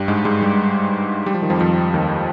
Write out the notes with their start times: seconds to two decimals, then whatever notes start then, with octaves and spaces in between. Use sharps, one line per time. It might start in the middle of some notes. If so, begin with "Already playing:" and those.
Already playing: G2 G3
0.08 G#2 G#3
0.25 G#2 G#3
0.42 G2 G3
1.26 G3
1.34 F3
1.42 D#3
1.50 F2 F3
1.60 F2 F3
1.94 D#2 D#3